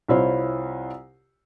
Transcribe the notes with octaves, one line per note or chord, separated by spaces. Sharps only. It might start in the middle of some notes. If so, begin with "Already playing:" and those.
C2 E4 F4 C5 C#5